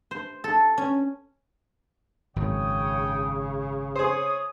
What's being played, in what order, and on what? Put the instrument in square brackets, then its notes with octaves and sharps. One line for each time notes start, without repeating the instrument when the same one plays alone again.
[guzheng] C5
A4
C#4
[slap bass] G#1 F#2 [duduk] C#3 [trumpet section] C#5 G5 D#6
[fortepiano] G#4 C5 [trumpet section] C#5 D#6